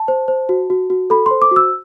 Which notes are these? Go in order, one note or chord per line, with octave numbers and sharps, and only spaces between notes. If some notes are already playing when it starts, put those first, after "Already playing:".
Already playing: A5
C5
C5
F#4
F#4
F#4
A4 B5
C5 C6
D6
F#4 E6